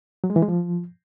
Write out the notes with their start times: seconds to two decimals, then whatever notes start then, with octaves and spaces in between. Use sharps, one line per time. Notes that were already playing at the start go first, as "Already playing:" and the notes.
0.24 F#3
0.30 G#3
0.36 E3
0.42 G#3
0.48 F3